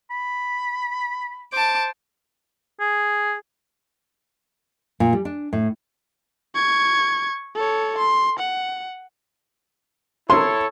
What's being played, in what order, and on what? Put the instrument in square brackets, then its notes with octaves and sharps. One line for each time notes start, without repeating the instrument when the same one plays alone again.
[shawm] B5
[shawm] C5 [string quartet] A5 D6
[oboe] G#4
[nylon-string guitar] A#2
G3
D4
A2
[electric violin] C#6 G#6
A4 C#5
C6
F#5
[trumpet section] E4 A4 C#5 [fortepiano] C6